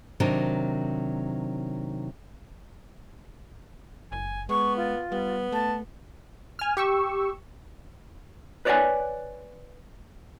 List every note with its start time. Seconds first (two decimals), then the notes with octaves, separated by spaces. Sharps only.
0.20 C3 D#3 F#3 D4 A#4
4.12 F#1 G#5
4.49 G#3 B3 C#6
4.76 F4
5.12 G3 B3
5.52 A3 A5
6.59 G#5 F6
6.77 G4 C#6 E6
8.65 B4 C#5 D5 F5 F#5 G#5